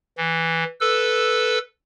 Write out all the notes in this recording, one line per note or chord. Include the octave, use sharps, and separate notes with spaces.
E3
A4 B4 E6